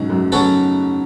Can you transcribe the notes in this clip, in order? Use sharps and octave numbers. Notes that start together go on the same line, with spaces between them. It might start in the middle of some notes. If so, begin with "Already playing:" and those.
Already playing: C#2 G#2 B2 F#3
F#2
C#3 F#3 B3 F#4 A4